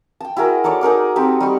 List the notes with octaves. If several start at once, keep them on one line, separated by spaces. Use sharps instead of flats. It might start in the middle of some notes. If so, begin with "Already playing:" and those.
G5 A5
E4 F#4 G#4 A#4
D#4 A4 C#5 D5
D#4 G#4 A#4 D6
C4 D#4 G4 A4
G3 C#6